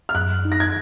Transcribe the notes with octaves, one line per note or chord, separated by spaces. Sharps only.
F6
F#2 F#6
D#4
A#6
G#6